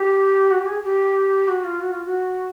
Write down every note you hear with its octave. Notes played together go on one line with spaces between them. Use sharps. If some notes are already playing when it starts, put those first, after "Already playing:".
Already playing: G4
F#4
G4
G#4
G4
F#4
F4
F#4
F4
F#4